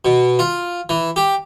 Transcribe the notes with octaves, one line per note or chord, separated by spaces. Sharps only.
B2
F4
E3
G4